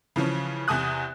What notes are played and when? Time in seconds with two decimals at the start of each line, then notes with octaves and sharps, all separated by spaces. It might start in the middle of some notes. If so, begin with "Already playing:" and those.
0.16 C#3 E3 F3 C#4
0.68 E2 C3 G#5 D#6 F#6